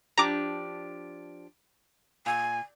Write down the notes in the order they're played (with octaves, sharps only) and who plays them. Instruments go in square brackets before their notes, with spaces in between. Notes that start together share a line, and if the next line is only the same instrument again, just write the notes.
[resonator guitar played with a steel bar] F3 D4 G4 [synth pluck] A#5 D6
[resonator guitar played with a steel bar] A#2 [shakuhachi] G#5